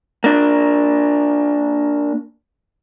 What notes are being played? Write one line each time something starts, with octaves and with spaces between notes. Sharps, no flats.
A#3 D4